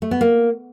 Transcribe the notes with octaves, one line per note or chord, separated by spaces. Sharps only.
A3
B3
A#3